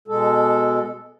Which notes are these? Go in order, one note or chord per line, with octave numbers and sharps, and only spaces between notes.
B2 G#3 A4